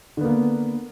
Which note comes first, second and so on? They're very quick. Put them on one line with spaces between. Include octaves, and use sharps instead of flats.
D3 B3 A#3